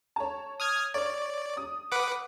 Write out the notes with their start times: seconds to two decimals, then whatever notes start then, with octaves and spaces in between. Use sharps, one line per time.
0.16 C#5 A5
0.60 D#6 F6 G#6
0.94 C#5 D5
1.57 D#6
1.92 B4 F#5 D6